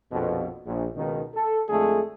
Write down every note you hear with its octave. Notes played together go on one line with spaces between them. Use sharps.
A#1 F2 B2
A#1
C#2 B2 D#3
A4
F2 D3 G#3 A3 G#4 A4